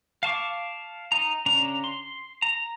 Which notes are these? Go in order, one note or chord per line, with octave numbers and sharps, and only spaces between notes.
F5 A5 C#6 D6
D#4 A#5
C#3 C#4 D4 A#5
C6
A#5